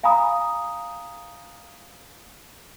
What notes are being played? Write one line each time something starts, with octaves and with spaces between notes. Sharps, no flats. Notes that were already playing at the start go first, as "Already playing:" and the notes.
F5 G#5 A#5 B5 D#6